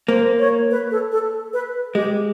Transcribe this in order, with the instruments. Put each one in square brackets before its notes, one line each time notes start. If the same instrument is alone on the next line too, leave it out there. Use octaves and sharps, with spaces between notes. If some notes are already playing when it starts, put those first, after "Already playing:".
[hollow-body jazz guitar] A#3 [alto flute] C5
[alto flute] C#5
B4
A4
A4
B4
[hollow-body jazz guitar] G#3 [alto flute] G4